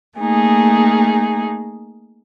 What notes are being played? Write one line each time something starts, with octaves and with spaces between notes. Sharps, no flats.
A3 A#3 D#4 G#4